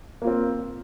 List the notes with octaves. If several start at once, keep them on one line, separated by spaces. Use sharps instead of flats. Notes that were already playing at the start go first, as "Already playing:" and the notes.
A#3 C4 F4